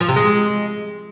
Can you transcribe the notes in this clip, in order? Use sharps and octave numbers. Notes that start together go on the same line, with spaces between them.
F3
C3
G#3